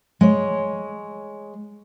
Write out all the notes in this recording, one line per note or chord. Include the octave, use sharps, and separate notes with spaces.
G#3 C#5